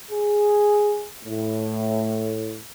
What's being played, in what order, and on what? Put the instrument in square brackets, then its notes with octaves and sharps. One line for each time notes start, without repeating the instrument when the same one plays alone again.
[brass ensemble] G#4
A2